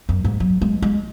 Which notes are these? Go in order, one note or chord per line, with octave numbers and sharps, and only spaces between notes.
F#2
G#2
F#3
G#3
G#3